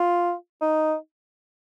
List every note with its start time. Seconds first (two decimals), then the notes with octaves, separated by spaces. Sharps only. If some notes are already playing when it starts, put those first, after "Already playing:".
Already playing: F4
0.61 D#4